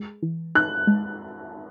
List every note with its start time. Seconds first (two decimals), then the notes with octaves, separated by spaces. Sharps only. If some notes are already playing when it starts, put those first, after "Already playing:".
Already playing: G#3
0.23 E3
0.55 D#4 F#6
0.87 G#3